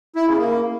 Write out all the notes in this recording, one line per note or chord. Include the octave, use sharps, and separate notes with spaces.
E4
C#3
A#3